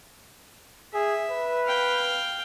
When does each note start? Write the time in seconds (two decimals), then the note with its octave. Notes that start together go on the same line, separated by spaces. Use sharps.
0.94 G#4 E5
1.31 B4
1.66 F5 G5